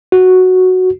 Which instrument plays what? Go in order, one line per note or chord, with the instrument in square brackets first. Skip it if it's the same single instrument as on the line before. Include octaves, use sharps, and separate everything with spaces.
[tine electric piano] F#4